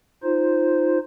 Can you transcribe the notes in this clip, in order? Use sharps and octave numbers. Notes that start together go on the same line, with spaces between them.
D#4 F4 C5